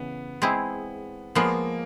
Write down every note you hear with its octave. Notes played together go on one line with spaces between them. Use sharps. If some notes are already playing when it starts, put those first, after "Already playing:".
Already playing: C#3 E3 B3
G#3 C4 E4 G#4
F3 G#3 A#3 B3